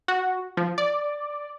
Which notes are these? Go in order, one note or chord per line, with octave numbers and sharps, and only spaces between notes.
F#4
F3
D5